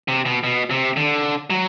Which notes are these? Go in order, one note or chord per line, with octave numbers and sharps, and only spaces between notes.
C3
B2
B2
C3
D3
F#3